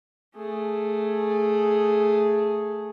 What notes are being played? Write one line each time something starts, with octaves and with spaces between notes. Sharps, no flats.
A3 G#4